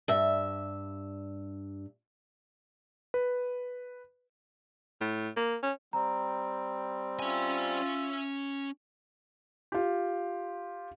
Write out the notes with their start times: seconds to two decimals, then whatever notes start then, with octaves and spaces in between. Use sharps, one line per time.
0.08 G2 E5
3.14 B4
5.01 A2
5.36 A#3
5.63 C#4
5.93 G3 C4 A#5
7.19 C#4 F4 E5 G#5
9.72 F4 G4